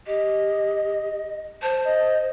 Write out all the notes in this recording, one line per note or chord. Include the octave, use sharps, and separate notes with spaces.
G4 D#5
C5 A5
D#5